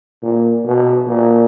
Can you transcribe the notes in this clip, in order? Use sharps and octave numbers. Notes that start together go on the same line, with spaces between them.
A#2
B2
A#2